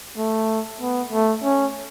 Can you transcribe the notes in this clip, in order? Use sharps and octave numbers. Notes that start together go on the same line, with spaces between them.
A3
B3
A3
C#4